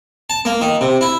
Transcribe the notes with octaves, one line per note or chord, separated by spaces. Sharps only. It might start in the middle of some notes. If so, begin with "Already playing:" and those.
A5
A#3
D#3
C3
E4